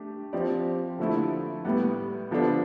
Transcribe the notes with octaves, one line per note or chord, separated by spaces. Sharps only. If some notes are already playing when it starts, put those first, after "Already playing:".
Already playing: A3 D4 G4
F3 C4 G4 D5
D3 F3 A3 E4 A4
A2 G3 B3
D3 F3 B3 D4 A4